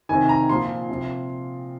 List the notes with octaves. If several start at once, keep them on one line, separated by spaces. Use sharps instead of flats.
C3 D#3 G#5
A#5
A#2 F3 C6
C3 F3